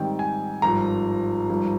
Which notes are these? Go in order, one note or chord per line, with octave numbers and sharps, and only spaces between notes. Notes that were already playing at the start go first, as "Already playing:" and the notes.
Already playing: G#2 D#3 G3 C4 G5
G#5
G#1 G2 F3 A#5
G#1 G2 F3